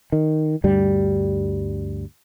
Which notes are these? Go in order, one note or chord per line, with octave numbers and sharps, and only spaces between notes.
D#3
D2 G2 G3